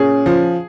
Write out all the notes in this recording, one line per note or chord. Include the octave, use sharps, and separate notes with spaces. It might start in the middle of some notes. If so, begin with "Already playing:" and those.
Already playing: A#2 C#4 G#4
F3